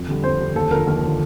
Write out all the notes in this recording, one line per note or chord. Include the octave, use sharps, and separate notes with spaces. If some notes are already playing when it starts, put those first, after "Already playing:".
Already playing: F2
D3 G3
F2 C5
D3 G3
D#2 A4
D3 F3 A#4
D#2 A#4
D3 F3